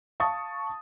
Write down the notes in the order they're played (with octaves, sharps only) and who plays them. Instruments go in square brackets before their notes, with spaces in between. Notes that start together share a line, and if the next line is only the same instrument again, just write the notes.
[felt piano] F5 A5 C#6 D#6 A6